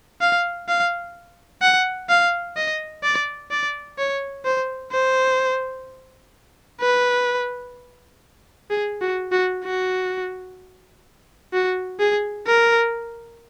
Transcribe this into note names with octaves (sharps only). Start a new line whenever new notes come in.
F5
F5
F#5
F5
D#5
D5
D5
C#5
C5
C5
B4
G#4
F#4
F#4
F#4
F#4
G#4
A#4